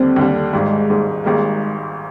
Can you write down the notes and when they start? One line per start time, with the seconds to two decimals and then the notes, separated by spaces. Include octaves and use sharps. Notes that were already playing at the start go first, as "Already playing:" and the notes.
Already playing: D#2 D3 G3 C4
0.16 D#2 D3 G3
0.53 G#1 G#2 G3 G#3
0.89 G#1 G#2 G3
1.24 G#1 G#2 G3 G#3 A#3